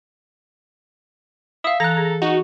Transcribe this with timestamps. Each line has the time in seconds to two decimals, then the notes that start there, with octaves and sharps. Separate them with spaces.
1.64 E5 F5 D#6
1.80 E3 A4 A#5 F#6 A#6
1.97 G#4
2.22 D#4 F#4